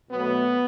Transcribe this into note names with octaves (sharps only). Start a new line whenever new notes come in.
B2 F#3 A3 B3